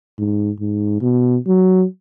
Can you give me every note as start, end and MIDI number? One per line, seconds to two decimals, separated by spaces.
0.18 0.50 44
0.60 0.97 44
1.01 1.37 47
1.47 1.84 54